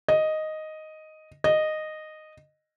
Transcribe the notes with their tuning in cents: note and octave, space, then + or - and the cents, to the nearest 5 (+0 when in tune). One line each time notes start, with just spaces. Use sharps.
D#5 +0
D#5 -10